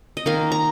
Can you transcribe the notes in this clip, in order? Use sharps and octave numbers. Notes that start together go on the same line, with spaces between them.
D#5
D#3 A#3 D#4 F5
A#5